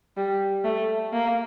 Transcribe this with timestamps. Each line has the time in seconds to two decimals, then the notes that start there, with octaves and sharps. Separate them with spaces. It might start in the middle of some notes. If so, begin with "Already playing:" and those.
0.17 G3
0.64 A3
1.13 A#3